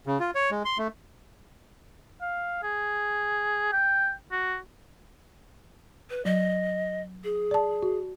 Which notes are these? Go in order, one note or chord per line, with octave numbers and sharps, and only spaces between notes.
C#3
F4
C#5
G#3
C6
A3
F5
G#4
G5
F#4
B4
F#3 D#5
G#4
D5 A5
F#4